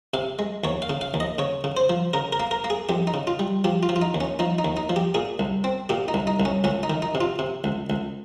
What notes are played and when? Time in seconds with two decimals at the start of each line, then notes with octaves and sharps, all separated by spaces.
0.14 C3 F5
0.39 G#3
0.64 D#2 C#5
0.82 F5
0.89 C#3
1.01 F5
1.14 D#2
1.20 D#5
1.38 C#3 C#5
1.64 C#3
1.77 C5
1.89 F3
2.13 C#3 A#4
2.33 A#4
2.40 A#3
2.51 A#4
2.64 A#3
2.70 G#4
2.89 F2 G4
3.07 D#4
3.14 C#3
3.27 F4
3.39 G3
3.64 F3 G4
3.83 F4
3.89 F3
3.96 F4
4.02 D#4
4.14 D#2
4.21 C#4
4.39 F3 D#4
4.58 D#4
4.65 D#2
4.77 D#4
4.89 F3
4.96 G4
5.14 A#2 G#4
5.39 C2
5.64 C4
5.89 A#2 G4
6.08 D#4
6.14 C2
6.27 D#4
6.40 C2
6.45 C#4
6.64 C#2 C#4
6.83 D#4
6.90 D#3
7.02 D#4
7.15 C3
7.21 F4
7.39 C3
7.64 C#2
7.90 C#2